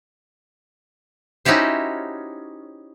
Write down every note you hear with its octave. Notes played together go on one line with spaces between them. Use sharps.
C#4 D#4 E4 F#4 G4 C5